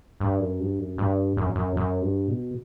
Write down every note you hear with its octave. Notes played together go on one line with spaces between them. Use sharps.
G2
F#2
G2
F#2
G2
F#2
F#2
F#2
G2
B2